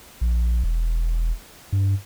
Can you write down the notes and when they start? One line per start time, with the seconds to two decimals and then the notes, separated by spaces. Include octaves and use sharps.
0.21 A#1
0.64 E1
1.72 G2